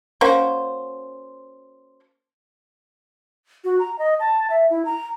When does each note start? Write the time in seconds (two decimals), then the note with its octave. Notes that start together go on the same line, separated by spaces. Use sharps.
0.21 A#3 C#4 F#4 C5
3.64 F#4
3.79 A#5
3.99 D#5
4.20 A5
4.50 E5
4.70 E4
4.85 A#5